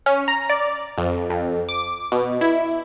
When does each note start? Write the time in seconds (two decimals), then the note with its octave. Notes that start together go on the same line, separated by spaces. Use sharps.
0.06 C#4
0.28 A#5
0.50 D5
0.98 F2
1.30 F2
1.69 D6
2.12 B2
2.41 E4